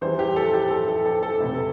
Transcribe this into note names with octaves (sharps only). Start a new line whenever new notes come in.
E2 E3 G3 E4 C5
G4
A4
G4
A4
A4
A4
A4
E1 E2 C3 A3 E4